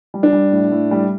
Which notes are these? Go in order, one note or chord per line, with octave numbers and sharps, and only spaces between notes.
G3
D4
G3
A2
A2
G3